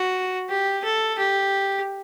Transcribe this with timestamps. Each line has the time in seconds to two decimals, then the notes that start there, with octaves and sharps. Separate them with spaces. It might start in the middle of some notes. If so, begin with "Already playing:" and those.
Already playing: F#4
0.49 G4
0.84 A4
1.18 G4